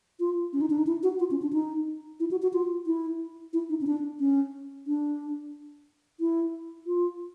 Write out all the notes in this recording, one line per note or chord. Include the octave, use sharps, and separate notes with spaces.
F4
C#4
D#4
D4
D#4
E4
F#4
F4
C#4
D4
D#4
E4
F#4
F#4
F4
E4
E4
D#4
C#4
D4
C#4
D4
E4
F4